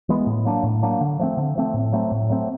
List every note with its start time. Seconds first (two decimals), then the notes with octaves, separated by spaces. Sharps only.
0.09 E3 G#3 B3
0.27 A2
0.45 F#3 A#3 D4
0.64 A2
0.83 F#3 A#3 D4
1.01 D3
1.19 F3 A3 C4
1.37 D3
1.56 F3 A3 C4
1.74 A2
1.92 F#3 A3 C4
2.12 A2
2.29 F#3 A3 C4